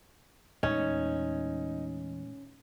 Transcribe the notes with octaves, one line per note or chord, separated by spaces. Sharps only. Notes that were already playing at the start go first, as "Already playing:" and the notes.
E2 A#2 G#3 A3 C#4 D#4